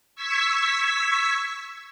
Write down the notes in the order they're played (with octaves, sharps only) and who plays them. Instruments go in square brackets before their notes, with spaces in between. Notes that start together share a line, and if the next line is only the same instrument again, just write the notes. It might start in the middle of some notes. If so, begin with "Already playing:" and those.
[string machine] C#6 E6 G#6 B6